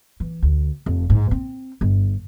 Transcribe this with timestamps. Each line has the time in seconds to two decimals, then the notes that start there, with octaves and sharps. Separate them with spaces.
0.20 E3
0.43 D2
0.86 F1
1.10 G#2
1.31 C4
1.81 G1